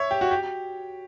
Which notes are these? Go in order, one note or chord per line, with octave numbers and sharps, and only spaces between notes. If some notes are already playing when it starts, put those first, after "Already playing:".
Already playing: C#5 E5
G4
F#4
G4